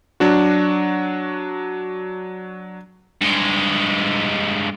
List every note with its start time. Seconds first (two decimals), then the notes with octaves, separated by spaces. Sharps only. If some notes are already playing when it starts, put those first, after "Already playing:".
0.20 F#3 D4 F#4
3.22 G2 G#3